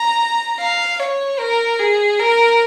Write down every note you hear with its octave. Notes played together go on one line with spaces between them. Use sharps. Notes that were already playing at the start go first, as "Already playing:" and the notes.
Already playing: A#5
F5
C#5
A#4
G#4
A#4